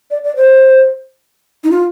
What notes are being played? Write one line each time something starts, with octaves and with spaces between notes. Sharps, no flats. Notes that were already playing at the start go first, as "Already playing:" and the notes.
D5
D5
C5
D#4
F4